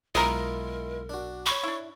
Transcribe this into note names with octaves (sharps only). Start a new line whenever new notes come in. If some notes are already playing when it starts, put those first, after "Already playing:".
B1 G#3 E4 F4 A#4 D#5 A#5
D4 F#4
C#5 B5 C#6
D4 E4